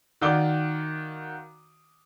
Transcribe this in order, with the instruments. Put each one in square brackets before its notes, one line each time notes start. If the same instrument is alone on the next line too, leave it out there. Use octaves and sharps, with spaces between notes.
[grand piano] D#3 F#4 D5 F5 D6 G7